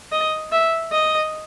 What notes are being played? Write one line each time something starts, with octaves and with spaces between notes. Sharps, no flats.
D#5
E5
D#5